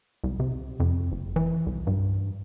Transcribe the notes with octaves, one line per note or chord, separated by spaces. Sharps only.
C2
C3
F2
F#1
E3
C2
G2